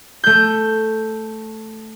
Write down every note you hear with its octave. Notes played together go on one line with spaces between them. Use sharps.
A3 G6